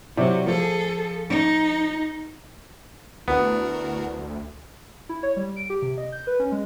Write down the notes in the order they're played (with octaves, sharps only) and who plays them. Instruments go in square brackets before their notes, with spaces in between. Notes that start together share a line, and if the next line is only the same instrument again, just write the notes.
[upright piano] C3 E4 D5 [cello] F#3
[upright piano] F3 [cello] G#4 A4
[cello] D#4
[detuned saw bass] D2 [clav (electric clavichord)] B3 [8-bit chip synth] D4 F#4 A#4 [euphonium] E4
[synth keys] E4
C#5
G3
D7
G4
C3
D#5
G6
B4
C#4
G#3